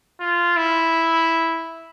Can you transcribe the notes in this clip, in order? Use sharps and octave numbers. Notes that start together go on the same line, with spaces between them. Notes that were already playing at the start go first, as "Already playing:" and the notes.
F4
E4